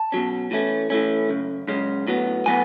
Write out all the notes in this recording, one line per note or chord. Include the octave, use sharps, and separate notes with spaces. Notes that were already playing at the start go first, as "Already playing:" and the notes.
Already playing: A5
B2 F#3 C#4
A2 E3 A3 C#4
A2 E3 A3 C#4
F#2 C#3
F#2 C#3 G#3 C#4
A2 F#3 B3
A2 F#3 B3 G#5